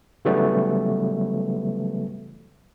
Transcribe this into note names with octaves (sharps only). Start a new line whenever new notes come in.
C#3 E3 F#3 G3 A3 B3